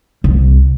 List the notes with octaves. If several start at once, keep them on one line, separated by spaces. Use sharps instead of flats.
C2